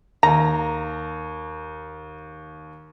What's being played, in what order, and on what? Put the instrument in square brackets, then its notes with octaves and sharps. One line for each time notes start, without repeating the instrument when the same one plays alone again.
[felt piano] D#2 [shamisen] A#5